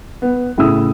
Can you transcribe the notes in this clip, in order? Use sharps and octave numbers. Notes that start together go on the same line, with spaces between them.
B3
A2 C#3 E4 D#6 E6